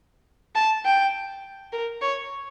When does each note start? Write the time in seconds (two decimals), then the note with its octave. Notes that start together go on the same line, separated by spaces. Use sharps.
0.55 A5
0.85 G5
1.72 A#4
2.02 C#5